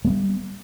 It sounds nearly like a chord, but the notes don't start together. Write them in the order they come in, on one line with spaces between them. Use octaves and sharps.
A3 B3 G3